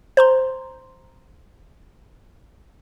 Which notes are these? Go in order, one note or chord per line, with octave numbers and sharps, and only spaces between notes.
C5 A#5 C6